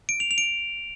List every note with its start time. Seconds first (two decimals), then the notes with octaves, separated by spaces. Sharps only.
0.09 D7
0.20 F7
0.31 F7
0.38 D7